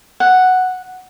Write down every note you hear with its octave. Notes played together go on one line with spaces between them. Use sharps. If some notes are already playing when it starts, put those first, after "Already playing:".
F#5